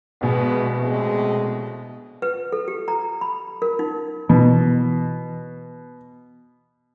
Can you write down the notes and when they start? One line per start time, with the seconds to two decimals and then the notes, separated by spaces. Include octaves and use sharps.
0.21 A#1 B2 G#3 B3 G#4
0.80 A2 C3 G#3
2.22 B4
2.52 A4
2.68 G4
2.88 A#5
3.21 B5
3.62 A#4
3.79 D#4
4.29 B2 E3